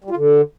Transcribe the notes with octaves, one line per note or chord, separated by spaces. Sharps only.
G3
F4
D3